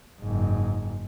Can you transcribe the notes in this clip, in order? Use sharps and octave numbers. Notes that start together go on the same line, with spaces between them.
F#1 G#2